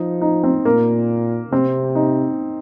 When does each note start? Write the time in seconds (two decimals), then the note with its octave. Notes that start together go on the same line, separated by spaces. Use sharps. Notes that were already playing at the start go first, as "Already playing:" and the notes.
Already playing: F3 D#4
0.21 D#4
0.44 C4
0.65 A#2 A#3
1.51 C3 C4
1.95 D#4